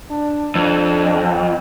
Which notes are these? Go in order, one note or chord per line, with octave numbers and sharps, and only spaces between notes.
D4
F2 D4